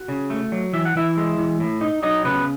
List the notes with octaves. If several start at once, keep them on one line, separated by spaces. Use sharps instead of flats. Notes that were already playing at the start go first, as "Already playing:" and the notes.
Already playing: F#4
C#3
A3
F#3
E3 E5
F#5
E3 E4 E5
G#3
E3
A2
D#4
F#3 D#4 D#5
C#3 B3 B4